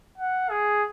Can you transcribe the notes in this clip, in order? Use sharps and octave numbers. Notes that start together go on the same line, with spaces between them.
F#5
G#4